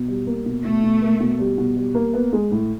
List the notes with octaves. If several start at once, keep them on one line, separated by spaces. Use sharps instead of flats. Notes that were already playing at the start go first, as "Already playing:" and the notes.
Already playing: B2
G3
A#3
B2
B2 A3
B2
A#3
B2
G3
B2
G3
A#3
B3
G#3
A2